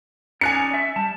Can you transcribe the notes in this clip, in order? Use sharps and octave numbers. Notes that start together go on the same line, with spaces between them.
C#4 D#4 D5 G#5 F#6 C#7
E5
G3 A5